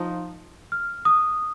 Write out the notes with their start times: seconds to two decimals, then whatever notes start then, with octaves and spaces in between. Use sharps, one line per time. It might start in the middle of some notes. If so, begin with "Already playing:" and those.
Already playing: F3 D#4
0.72 F6
1.05 D#6